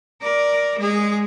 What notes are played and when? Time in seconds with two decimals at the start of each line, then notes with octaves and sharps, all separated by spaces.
0.21 A#4 D5
0.78 G#3 G#4